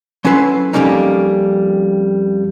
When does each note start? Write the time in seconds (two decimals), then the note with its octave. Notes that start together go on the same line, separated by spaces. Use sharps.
0.25 F#3 C#4 E4 A4 B4 C6
0.73 F2 F#3 G3 A#3 C#4 D#4